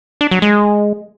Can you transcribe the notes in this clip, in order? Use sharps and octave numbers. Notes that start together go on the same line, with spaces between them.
D4
F#3
G#3